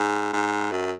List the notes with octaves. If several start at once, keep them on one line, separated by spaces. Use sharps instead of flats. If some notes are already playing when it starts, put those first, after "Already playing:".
Already playing: G#2
G#2
F#2